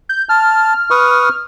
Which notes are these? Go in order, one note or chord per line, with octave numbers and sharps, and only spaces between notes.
G6
A5 F6
B4 C#6 D#6